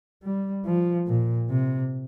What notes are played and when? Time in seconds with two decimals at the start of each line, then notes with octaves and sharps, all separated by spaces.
0.23 G3
0.66 F3
1.07 A#2
1.49 C3